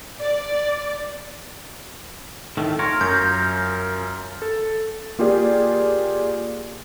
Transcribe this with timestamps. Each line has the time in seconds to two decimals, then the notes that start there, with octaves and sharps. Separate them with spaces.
0.20 D5
2.57 A2 D#3 A3
2.79 F4 A#4 C#5
3.01 F#2 G6
4.42 A4
5.19 A#3 F4 G4 G#4 D5